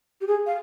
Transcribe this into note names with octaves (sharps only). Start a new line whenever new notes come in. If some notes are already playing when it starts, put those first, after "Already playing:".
G4
G#4
F5